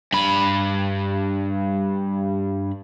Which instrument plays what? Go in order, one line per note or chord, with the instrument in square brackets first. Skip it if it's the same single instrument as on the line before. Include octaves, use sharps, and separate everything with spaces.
[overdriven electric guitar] G2 B5